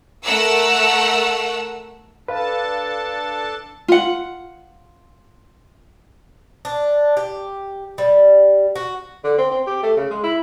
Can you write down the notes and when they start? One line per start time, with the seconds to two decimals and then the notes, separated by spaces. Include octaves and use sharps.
0.24 A3 A#4 F#5 E6
2.28 D4 A4 B4 F5 A5
3.88 F4 F#5
6.65 D4
7.17 G4
7.98 G3
8.76 F#4
9.24 D3
9.38 C4
9.51 C4
9.67 G4
9.83 A3
9.97 C#3
10.11 G#3
10.24 E4